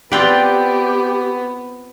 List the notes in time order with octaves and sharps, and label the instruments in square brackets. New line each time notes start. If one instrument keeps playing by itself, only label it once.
[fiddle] B3 [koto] C4 F4 B4 [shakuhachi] G4 [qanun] D5 G5